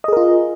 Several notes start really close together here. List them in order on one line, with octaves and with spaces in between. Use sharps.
D#5 G#4 A#4 F4